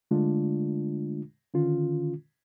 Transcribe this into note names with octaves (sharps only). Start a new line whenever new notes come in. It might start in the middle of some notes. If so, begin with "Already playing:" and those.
D3 G#3 A3 D4 F4
D3 D#3 C#4 F4